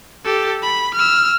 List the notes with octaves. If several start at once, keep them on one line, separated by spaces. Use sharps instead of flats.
G4 A4
B5
E6 F6